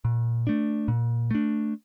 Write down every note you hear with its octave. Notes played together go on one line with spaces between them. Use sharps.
A#2
A3 D4
A#2
A3 D4